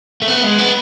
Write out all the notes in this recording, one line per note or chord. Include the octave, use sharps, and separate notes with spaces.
A3
B3
G#3
B3